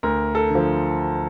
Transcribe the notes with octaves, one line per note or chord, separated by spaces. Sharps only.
D2 A#4
A4
D3 F3